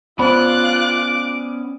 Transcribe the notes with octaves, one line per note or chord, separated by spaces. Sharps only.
B3 C#4 F4 C5 D5 B5 D6 F#6